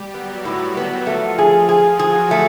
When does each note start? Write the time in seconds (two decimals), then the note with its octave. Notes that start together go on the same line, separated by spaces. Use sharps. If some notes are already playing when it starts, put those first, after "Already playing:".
Already playing: G3 G4
0.14 F#3 B3 F#4
0.45 A2
0.77 B3
1.07 F3 A3 F4
1.38 G#4
1.54 F3 F4
1.69 G#4
1.99 F#3 F#4 G#4
2.31 A3